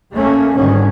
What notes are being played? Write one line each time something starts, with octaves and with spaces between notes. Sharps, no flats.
A1 A3 A#3 C#4
G1 G#2 D3 D#3 C#4